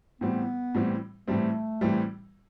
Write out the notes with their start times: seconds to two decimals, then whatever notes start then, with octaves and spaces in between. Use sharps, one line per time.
0.21 A2 E3 G3 B3 C4
0.74 A2 E3 G3 C4
1.28 A2 E3 G3 A3 C4
1.81 A2 E3 G3 C4